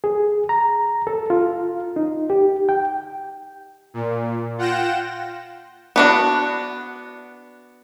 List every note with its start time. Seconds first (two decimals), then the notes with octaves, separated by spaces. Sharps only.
0.04 G#4
0.49 A#5
1.07 A4
1.30 F4
1.96 D#4
2.30 G4
2.69 G5
3.94 A#2
4.58 F4 F#5 G5 A#6 E7
5.96 B3 D4 F#4